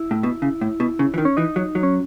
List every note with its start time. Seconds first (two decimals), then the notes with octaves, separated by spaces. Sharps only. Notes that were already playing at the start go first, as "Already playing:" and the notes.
Already playing: E4
0.11 A2
0.23 B2
0.42 C#3
0.61 A2
0.80 B2
0.99 C#3
1.14 E3
1.18 D#3
1.25 C#4
1.37 E3 D#4
1.56 F#3
1.75 F#3
1.83 C#4